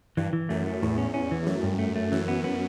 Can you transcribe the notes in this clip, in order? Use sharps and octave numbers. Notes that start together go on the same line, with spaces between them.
G2 E3
E3
F#2 A3
A3
E2 A2
C#4
C#4
E3
F#2 A3
G2
A3
A3
F#2 E3
B3
B3